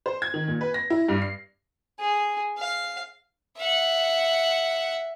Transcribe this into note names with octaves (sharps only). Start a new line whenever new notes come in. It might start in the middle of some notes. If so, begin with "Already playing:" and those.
C5
G#6
D#3
A#2
B4
A#6
E4
G2
C7
G#4
F5
E5 F#5